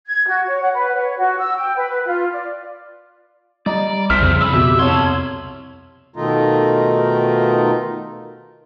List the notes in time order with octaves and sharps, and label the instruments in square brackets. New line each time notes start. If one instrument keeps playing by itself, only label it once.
[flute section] G#6
F#4
C#5
F#5
B4
C#5
F#4
E6
G5
B4
F4
D5
[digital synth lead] G3 [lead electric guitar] D5 [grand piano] D#5 A#5
[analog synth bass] C2 [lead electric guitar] E3 C4 [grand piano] F6 B6
[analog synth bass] F2 [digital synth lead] C#3
[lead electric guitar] A#2 B5 [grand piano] E6
[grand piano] B2 [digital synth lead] G4 [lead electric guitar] E5
[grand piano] C2 C#5 [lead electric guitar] A5 C6 [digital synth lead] G#6
[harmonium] B2 D#3 A3 D#4 F4 A#4